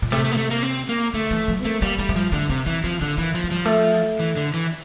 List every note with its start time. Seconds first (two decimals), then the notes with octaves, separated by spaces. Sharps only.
0.02 A#2
0.12 C3 A3
0.24 A3
0.32 A#3
0.37 A3
0.50 A#3
0.63 C4
0.89 A#3
1.13 D3 A3
1.31 E3
1.48 F3
1.61 C4
1.65 A3 A#3
1.82 G3 A#3
1.99 G3 A3
2.09 A3
2.15 F3 G3
2.32 D3 A3
2.49 C3 A#3
2.66 E3 C4
2.84 F3 C4
3.01 D3 A#3
3.18 E3 A#3
3.34 F3
3.44 A3
3.51 F3 G3
3.66 A3
4.20 E3
4.36 D3
4.54 E3